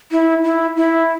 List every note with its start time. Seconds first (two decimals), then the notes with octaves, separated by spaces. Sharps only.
0.11 E4
0.44 E4
0.76 E4